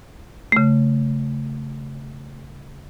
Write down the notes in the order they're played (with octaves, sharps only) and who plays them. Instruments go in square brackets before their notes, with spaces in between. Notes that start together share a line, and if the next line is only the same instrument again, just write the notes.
[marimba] C#3 A3